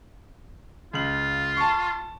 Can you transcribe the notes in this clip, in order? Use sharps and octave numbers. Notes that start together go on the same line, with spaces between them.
C#2 F4 F#7
A5 C#6